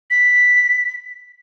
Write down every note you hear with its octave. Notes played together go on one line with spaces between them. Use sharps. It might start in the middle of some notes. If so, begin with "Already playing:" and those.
B6